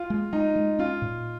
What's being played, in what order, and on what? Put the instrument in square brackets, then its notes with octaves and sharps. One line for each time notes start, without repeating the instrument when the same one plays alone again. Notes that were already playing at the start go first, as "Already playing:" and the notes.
Already playing: [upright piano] F4
[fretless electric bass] G#3
[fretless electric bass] G#3 [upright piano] D#4
[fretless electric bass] G#3
[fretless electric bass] C#4 [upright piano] F4
[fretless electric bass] A#2